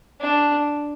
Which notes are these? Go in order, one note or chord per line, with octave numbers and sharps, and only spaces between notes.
D4